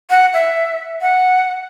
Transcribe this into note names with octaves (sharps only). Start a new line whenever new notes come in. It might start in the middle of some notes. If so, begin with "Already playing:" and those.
F#5
E5
F#5